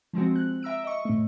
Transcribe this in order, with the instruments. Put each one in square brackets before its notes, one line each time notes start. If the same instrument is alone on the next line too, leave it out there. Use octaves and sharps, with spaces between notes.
[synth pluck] F3 G#3 C4 F#4
F#6
E5 A#5 E6 D7
D#5 C#6
A2 A3